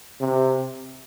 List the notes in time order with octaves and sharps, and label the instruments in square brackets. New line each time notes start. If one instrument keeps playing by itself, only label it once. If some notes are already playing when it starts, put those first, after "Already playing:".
[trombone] C3